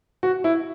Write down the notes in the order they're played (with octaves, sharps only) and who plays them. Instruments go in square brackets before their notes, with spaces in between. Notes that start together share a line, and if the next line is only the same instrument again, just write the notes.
[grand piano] F#4
E4